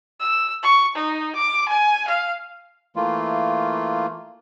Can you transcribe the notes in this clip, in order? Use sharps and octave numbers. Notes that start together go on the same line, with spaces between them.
E6
C#6
D#4
D6
G#5
F5
E3 A3 A#3 F4